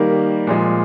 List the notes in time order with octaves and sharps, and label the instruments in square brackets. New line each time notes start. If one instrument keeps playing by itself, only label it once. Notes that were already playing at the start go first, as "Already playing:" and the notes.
Already playing: [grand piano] D#3 G3 A#3
A#2 F3 G#3